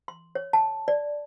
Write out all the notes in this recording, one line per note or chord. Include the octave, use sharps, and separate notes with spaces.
C6
C#5
A5
D5